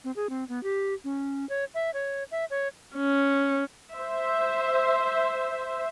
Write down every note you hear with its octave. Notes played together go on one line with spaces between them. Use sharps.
C4
G#4
C4
B3
G4
C#4
C#5
E5
C#5
E5
C#5
C#4
C5 E5